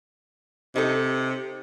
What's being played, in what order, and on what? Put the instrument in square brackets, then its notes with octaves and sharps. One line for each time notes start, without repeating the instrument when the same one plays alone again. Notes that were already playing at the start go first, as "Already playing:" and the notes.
[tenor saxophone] C3 [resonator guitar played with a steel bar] D#4 A4